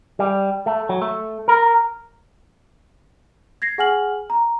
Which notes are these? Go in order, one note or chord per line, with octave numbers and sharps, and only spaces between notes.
G3
A3
F#3
A3
A#4
G#6 A#6 C7
G#4 F#5 G#5 F6 F#7
A#5